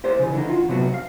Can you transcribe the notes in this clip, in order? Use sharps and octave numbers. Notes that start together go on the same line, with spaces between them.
G4 C5 D5
C#3 E3
D3 E3 D#4
F4 F#4
C3 F#3 B3 F#4
F5